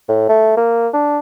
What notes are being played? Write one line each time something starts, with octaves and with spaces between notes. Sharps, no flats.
A2
A3
A#3
D4